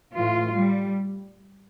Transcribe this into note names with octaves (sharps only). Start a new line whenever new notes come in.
A2 E3 F4
G3